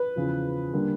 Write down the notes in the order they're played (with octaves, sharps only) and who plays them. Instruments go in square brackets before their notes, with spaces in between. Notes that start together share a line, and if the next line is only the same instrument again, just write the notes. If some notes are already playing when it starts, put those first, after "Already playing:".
Already playing: [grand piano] B4
[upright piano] E2 C#3 F3
D3 G3 A#3